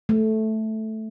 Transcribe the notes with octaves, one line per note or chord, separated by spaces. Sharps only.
A3